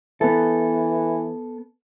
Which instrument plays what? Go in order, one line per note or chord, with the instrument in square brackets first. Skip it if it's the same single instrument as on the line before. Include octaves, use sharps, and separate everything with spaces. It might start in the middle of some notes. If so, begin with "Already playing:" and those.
[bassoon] E3 [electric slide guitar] B3 A4